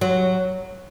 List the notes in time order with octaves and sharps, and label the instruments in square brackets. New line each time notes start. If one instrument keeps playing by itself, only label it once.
[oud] F#3